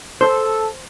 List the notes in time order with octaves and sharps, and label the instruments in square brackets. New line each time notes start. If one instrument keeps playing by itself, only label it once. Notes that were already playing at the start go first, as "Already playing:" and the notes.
[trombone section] A4 [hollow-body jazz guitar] C5